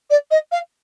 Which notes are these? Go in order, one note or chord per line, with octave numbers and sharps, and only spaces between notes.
D5
D#5
F5